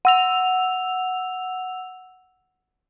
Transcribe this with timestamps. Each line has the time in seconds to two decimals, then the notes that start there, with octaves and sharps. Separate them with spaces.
0.05 F#5 E6 F7